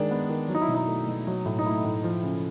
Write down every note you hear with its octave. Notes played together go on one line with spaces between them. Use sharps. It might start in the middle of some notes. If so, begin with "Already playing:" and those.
Already playing: D#3 G#3 D4
B3
D#3
F#3
D#4
E4
B2
D#4
A3
B2
F#3
A2
D#4
A3 E4
A2
F3
C#3